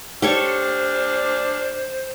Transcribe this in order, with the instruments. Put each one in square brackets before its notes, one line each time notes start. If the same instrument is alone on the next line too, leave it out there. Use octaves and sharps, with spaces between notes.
[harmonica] D4 F6 [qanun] G4 A4 C#5 [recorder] C5